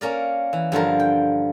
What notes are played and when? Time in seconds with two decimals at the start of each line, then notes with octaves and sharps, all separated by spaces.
0.01 A#3 C#4 A#4 D5
0.53 E3
0.72 G2 D3 F3 A#4
1.00 G5